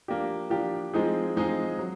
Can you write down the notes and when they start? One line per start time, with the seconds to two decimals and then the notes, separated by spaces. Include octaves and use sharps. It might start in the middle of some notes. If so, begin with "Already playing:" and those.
0.08 F3 A#3 D4 G4
0.50 F3 A#3 D4 G4
0.94 F3 G#3 C4 D#4 G#4
1.37 F3 G#3 C4 D#4 G#4
1.79 F#3